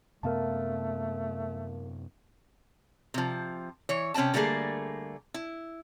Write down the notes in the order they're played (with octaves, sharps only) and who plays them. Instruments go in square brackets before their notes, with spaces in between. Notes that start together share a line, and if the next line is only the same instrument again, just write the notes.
[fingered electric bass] F#2 C3 B3 [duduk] A3 [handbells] A#4 F5 A5
[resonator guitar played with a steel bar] C3 F3
E3 C#5
C3 C#4 D5 G5 A5
D3 G3 A3 A#3 G#4
E4